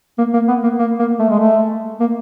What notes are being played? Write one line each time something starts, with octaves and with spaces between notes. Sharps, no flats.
A#3
A#3
B3
A#3
A#3
A#3
A3
G#3
A3
A#3